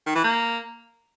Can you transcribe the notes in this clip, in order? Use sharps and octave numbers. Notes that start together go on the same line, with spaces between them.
D#3
E3
A#3